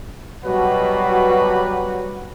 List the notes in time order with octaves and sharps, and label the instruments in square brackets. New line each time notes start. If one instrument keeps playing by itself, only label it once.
[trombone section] B2 [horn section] F#3 G3 B4 [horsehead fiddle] F#4